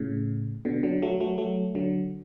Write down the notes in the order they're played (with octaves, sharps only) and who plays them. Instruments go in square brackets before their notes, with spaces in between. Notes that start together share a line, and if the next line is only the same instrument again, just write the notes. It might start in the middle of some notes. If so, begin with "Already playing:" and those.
Already playing: [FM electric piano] A2 C#3
B2 D3
D3 F#3
F#3 A3
F#3 A3
F#3 A3
D3 F#3